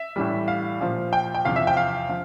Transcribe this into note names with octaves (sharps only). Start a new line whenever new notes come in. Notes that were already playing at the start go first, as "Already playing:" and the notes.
Already playing: E5
A2 E3 G3
F5
A#2 F3
G5
G5
E2 C3 F3 F5
E5
G5
F5
F3